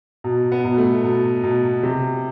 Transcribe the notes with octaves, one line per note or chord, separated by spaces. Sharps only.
B2
B3
B2
A3
B2
B2
C3